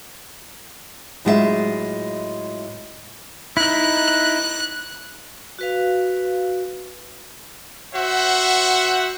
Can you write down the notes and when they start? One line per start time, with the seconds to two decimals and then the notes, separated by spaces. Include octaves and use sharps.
1.25 A2 F#3 G#3 F4 A#4 E5
3.57 D#4 E4 F#6
5.59 F#4 B4 F5
7.94 F#4 C5 E5 F#5